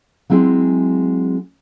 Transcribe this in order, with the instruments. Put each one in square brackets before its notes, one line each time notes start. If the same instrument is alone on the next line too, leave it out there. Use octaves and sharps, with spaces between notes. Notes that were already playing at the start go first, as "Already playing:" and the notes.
[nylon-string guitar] F#3 G#3 C4 E4 G#4